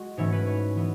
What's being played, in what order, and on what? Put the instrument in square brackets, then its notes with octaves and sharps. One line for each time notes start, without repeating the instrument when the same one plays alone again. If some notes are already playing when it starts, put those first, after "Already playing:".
Already playing: [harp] G#3 F#4
G#2 E3 A3 C#4 C#5
B4
C#5
E3 B3